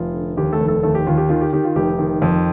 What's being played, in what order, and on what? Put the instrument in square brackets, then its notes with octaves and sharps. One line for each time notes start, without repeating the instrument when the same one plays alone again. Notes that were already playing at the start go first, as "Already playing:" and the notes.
Already playing: [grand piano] F1 F4
D3
D#2 G4
A3 A4
F1
A3 A4
D#2 A3 A4
G4
D#2 F4
G4
D#3 F4
G4
D#3 G4
F4
F1 G4
D#3
F2